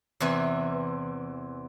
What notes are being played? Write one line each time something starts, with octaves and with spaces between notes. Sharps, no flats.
E2 C3 E3